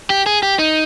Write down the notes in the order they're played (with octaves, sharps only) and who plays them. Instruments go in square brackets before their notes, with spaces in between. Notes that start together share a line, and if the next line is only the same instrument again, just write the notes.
[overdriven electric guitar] G4
G#4
G4
D#4